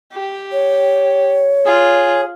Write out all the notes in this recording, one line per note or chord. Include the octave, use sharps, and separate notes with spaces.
G4
C#5
F4 G#4